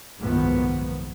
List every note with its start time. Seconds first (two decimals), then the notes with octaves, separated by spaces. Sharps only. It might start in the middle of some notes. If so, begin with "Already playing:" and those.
0.19 F#1 B1 G#2 D#3 F3 B3